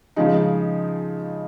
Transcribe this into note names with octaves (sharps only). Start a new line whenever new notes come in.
C#3 F3 G#3 D#4